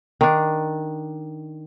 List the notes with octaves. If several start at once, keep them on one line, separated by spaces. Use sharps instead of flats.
D#3 D4